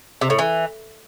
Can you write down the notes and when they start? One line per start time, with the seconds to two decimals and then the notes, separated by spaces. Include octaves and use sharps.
0.21 C3
0.30 A2
0.39 E3